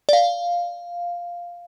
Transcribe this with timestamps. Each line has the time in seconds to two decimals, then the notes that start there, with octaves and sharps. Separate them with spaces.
0.09 D5
0.13 F5